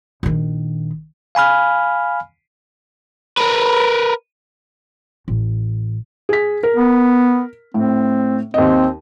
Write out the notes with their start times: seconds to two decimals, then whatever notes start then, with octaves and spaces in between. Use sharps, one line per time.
0.23 A#1 D#3
1.35 F5 G#5 B5 F6
3.38 A#4 B4
5.28 A1
6.29 G#4 B6
6.63 A#4
6.76 B3
7.74 A2 C4
8.54 D#2 C4 D#5